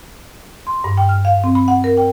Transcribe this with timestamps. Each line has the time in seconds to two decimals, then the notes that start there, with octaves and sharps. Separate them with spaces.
0.67 C6
0.84 G2
0.97 G5
1.09 F6
1.25 F5
1.44 C4
1.55 B5
1.68 F#5
1.84 A#4
1.97 G5